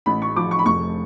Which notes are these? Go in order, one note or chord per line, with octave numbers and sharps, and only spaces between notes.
A1 B5
C#6
F3 D6
C#6
B5
F1 C#6